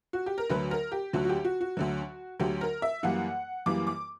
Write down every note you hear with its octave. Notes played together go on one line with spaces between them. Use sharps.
F#4
G4
A#4
D2 D3 F#3 B4
A#4
G4
D2 D3 F#3 F#4
F#4
G4
F#4
F#4
D2 D3 F#3
D2 D3 F#3 G4
A#4
E5
F#2 E3 G3 A#3 F#5
F#2 E3 G3 A#3 D6
D6